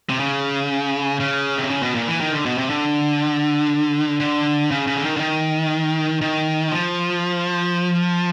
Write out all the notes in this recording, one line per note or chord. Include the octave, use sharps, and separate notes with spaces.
C3
C#3
C#3
C3
C#3
B2
A#2
E3
D#3
D3
B2
C3
D3
D3
C#3
C#3
D3
D#3
D3
D#3
D#3
F3